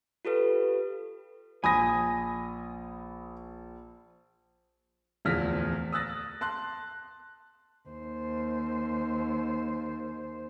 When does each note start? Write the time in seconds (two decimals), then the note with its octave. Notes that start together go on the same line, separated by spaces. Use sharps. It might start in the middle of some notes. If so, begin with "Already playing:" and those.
0.25 F4 G4 A4 B4
1.64 A#1 G#5 B5 D#6 A#6
5.25 D1 E2 F3 F6 A#6 B6
5.92 D#6 E6 F#6 A6 A#6
6.41 A5 C6 F#6
7.89 D#2 C5